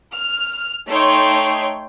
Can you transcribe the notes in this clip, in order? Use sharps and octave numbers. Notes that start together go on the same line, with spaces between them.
F6
A3 D#4 C#5 G5 C6